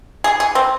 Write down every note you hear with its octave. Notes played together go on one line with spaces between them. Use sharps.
G#4
G#4
C4